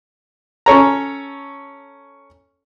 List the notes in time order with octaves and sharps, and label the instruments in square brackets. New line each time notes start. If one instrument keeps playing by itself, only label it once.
[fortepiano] C#4 A4 C#5 A#5